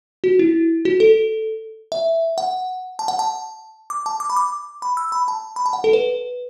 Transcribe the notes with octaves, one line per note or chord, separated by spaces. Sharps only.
F#4
E4
F#4
A4
E5
F#5
A5
F#5
A5
D6
A5
D6
B5
D6
B5
E6
B5
A5
B5
A5
F#5
A4
B4